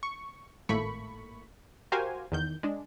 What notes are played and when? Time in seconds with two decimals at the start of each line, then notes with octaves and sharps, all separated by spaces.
0.03 C#6
0.69 G#1 A2 A3 A#3 B5 C#6
1.92 F#4 G4 A#4 C5 F5 G#5
2.32 E2 D#3 G6
2.63 G#3 D4